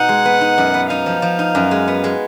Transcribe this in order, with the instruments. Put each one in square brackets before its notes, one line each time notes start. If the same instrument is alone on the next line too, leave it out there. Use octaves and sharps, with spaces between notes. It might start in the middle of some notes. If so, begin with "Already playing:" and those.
Already playing: [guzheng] B2 D#4 F#4 [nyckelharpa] F#5
[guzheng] G#3
B3
D#4
F#2
B3
[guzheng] D#4 [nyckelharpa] F5
[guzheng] F3
F3
D#4
F#2
G#3
B3
G#3